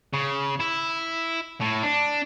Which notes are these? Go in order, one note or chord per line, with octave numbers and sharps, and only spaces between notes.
C#3
E4
A2
D4